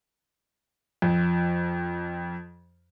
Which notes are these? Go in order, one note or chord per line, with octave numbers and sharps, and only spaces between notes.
F2 F3